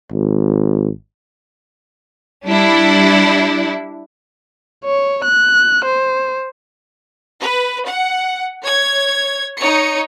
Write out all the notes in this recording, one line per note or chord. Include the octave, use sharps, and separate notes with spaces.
G#1
G3 D4 E4
C#5
F#6
C5
B4
F#5
C#5 G#6
D#4 C#5 C#7